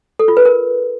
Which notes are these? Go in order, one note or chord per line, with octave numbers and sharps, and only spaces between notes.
A4
F4
B4
A#4